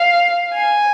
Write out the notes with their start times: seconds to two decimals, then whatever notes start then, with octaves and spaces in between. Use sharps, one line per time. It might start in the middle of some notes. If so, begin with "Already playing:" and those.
Already playing: F5
0.54 G#5